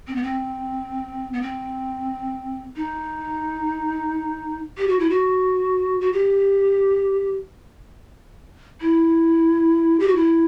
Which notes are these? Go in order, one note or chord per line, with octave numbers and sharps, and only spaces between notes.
C4
B3
C4
B3
C4
D#4
G4
F#4
E4
F#4
F#4
G4
E4
G4
F#4
E4